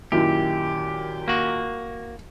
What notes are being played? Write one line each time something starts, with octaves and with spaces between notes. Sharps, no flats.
F#2 A#2 D#3 E4 G4
A#3 F#4